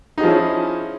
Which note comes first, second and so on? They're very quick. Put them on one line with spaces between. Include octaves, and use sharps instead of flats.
D#4 G#4 F3 C#4 E4